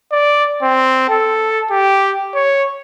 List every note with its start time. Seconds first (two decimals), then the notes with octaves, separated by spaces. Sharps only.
0.12 D5
0.63 C4
1.09 A4
1.71 G4
2.35 C#5